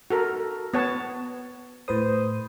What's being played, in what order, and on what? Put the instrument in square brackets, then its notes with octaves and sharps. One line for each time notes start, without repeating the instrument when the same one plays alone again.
[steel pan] F#4 A4 A#4
B3 C#5 A5
[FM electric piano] A2 B4 D#6 [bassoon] C5